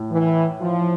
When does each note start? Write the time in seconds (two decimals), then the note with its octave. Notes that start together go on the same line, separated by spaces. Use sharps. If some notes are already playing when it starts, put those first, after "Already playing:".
Already playing: A2
0.12 E3
0.61 F3